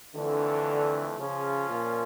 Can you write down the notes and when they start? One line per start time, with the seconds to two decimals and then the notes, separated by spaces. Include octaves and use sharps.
0.15 F2 D3 E3 A3
1.19 C#3 F3 C#4 F4
1.70 A#2